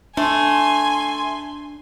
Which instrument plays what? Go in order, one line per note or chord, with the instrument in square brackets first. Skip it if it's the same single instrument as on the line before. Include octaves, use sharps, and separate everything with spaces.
[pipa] A3 [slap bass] D4 [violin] G#5 [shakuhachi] C6